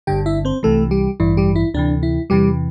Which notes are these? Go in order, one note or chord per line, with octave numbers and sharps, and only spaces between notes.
G1 G2 D3 G4 G5
E4 E5
C4 C5
C2 C3 E3 A3 A4
G3 G4
A1 G2 E3 E4
G3 G4
E4
D2 C3 E3 D4
E4
E2 C3 E3 G3 G4